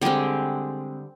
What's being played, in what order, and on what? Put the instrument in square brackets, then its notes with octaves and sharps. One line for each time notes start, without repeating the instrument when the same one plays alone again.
[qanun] D3 G3 G#3 C4 G4